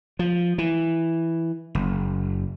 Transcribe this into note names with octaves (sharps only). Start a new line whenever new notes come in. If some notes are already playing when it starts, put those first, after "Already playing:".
F3
E3
F#1